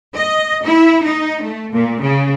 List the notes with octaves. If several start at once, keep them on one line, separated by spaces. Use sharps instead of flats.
D#5
E4
D#4
A3
A#2
C#3